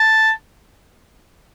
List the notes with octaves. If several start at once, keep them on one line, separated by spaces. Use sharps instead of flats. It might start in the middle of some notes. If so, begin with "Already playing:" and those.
Already playing: A5